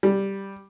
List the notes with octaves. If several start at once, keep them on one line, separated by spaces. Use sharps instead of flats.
G3